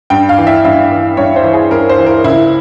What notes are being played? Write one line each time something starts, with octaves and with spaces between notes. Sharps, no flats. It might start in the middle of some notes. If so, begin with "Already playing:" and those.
G2 G5
F5
E3
E5
G2 E5
E3
G2 C#5
C5
E3
G#4
G2 A#4
C5
E3
A#4
C#2 E4